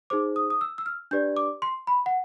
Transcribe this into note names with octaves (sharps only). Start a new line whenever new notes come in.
D#4 G#4 C5 D6
D#6
D#6
E6
E6
F6
D4 G4 B4 D5 G6
D6
C6
B5
F#5